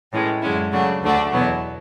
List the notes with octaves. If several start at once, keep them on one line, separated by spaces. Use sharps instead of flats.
A2 E3 G#3 C#4
F#2 D3 G#3 C#4 E4
C#3 F#3 A3 D4 F#4
D2 D3 A3 D4 F#4
E2 B2 F#3 B3 E4